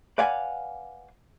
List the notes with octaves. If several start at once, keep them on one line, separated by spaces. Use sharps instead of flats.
B4 D5 F5 F#5 G#5